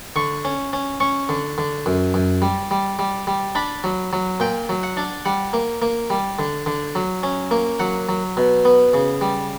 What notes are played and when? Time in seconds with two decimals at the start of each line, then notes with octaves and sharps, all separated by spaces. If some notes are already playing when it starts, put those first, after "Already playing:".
0.16 D3 C#6
0.45 C#4
0.73 C#4
1.00 C#4 C#6
1.29 D3
1.58 D3
1.86 F#2
2.14 F#2
2.42 G3
2.71 G3
2.99 G3
3.27 G3
3.55 D4 B5
3.84 F#3
4.13 F#3
4.40 A#2 G5
4.69 F#3
4.83 F#5
4.97 D4
5.25 G3 F#5
5.53 A#3
5.82 A#3
6.10 G3
6.39 D3
6.66 D3
6.95 F#3
7.23 C#4
7.51 A#3
7.80 F#3 F#5
8.09 F#3
8.37 B2
8.65 B3
8.94 C#3
9.21 G3